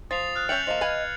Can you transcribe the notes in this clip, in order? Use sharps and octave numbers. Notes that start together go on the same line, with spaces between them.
F3 D#6 A6 C7 F7
F6 F#6
C#4 E5 G5 G6 C#7 F7 F#7
F3 G3 A#3 D#5
B4 F5 G#5 G#6